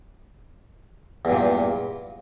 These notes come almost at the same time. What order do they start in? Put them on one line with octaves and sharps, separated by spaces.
E2 G2 A#2